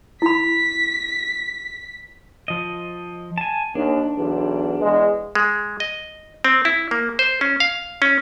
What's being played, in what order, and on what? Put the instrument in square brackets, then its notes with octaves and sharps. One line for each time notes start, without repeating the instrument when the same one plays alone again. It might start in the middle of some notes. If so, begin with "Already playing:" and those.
[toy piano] E4 B5 [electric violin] B6
[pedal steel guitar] F3 D#5
G#5 A5
[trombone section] D#2 [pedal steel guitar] D4
[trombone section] B1 E2
E2 G#3
[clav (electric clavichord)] G#3
D#5
C4
E4
A#3
C5
C#4
F5
C#4